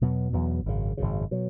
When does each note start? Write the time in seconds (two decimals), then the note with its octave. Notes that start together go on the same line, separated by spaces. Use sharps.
0.01 E2 B2 F#3 B3
0.33 E2 B2 F#3 B3
0.66 G#1 F#2 C#3
0.97 G#1 F#2 C#3
1.31 B2 F#3